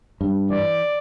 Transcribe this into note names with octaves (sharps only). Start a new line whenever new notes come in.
G2
E3 D5